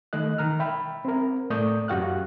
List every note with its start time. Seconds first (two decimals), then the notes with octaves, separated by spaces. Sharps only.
0.13 D#3 A3 D#5 F#6
0.38 D#3 A#5 F6
0.60 E5 G5 B5
1.05 C4 A#4
1.50 A2 A3 D5 C#6 D#6 G6
1.88 F#2 F#4 G4 F5 F6 F#6